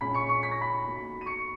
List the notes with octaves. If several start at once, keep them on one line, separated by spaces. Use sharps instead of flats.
A#1 A#2 G#3 C#4 B5 B6
C#6 C#7
C#6 C#7
B6
A#6
B5 B6
B1 B2 A#3
D#7
C#6 C#7